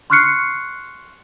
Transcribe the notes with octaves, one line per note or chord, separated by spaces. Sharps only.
C6 C#6 F6 F#6 C7 C#7